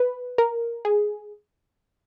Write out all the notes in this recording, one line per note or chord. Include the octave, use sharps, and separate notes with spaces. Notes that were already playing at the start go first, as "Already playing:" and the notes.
Already playing: B4
A#4
G#4